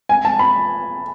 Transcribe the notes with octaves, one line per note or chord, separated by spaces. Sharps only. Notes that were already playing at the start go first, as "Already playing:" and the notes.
G#5
A5
B5